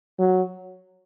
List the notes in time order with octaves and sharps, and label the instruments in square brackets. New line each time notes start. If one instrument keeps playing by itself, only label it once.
[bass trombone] F#3